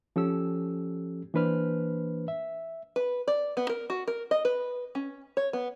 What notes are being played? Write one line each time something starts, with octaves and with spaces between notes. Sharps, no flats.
F3 C#4 G4 A4 E6
E3 A#3 D4 B4 C5 F6
E5
B4
D5
B3
A#4
F#4
A#4
D#5
B4
C#4
C#5
B3